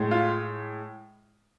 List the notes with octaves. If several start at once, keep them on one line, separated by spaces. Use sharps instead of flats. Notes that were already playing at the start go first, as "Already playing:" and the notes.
Already playing: A2 G#3
F4